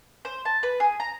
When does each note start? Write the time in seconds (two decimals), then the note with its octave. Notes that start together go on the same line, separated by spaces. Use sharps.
0.25 C5
0.45 A5
0.63 B4
0.80 G#4
1.00 A#5